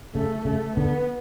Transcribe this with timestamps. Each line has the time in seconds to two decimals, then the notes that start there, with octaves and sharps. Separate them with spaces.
0.15 C#3 A3
0.45 C#3 A3
0.77 D3 B3